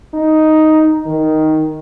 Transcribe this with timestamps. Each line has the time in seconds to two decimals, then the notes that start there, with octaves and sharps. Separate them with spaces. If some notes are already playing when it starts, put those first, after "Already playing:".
0.14 D#4
1.06 D#3